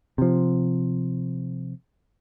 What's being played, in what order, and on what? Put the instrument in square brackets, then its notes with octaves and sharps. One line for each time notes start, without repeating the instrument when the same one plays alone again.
[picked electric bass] C3 F3